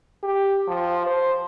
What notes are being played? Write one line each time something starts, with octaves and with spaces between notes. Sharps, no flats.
G4
F3
C5